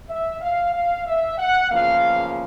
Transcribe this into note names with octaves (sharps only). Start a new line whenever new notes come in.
E5
F5
F5
E5
F#5
E2 C#3 F3 A#3 F5